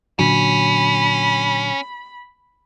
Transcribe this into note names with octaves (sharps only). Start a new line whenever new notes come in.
A#2 D3 F#3 C#4 B5